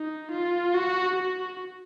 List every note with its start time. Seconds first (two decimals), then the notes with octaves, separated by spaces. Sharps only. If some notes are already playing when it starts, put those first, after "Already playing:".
Already playing: D#4
0.32 F4
0.74 F#4
1.15 F#4